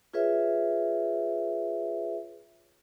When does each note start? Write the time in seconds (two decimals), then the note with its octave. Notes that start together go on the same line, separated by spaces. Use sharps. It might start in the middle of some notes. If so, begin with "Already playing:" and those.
0.14 F4 G#4 B4 C#5 E5